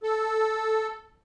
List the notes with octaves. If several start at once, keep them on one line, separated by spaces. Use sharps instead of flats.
A4